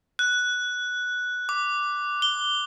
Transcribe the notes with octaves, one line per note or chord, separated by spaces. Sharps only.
F#6
D6
G7